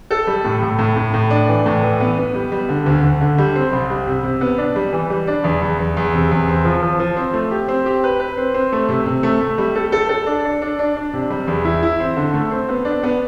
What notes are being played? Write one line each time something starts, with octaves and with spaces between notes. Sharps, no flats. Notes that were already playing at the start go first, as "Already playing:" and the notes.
A4
G3
A2
A2
A2
A2
A2
D4
E3
A2
E3
B3
B3
G3
G3
D3
D2
D2
D3
G3
C4
C2
G3
C3
C3
B3
D4
G3
E3
G3
D4
E2
E2
E2
E2
C3
E2
C4
F3
F3
F3
C4
A3
G4
C4
G4
B4
B4
C4
C4
A3
C3
C3
A3
A3
G3
A4
A4
A4
D4
D4
D4
D4
D4
C3
G3
E2
E4
E4
C4
D3
A3
C4
B3
D4
B3